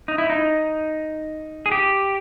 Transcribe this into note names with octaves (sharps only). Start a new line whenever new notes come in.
D#4
E4
D#4
G#4
G4